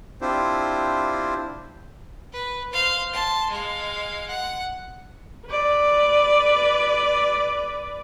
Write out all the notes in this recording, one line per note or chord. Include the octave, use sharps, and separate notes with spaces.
C4 D4 E4 F4 G4 C5
B4
C5 F5
A5 C6
G#3 F5
F#5
B4 D5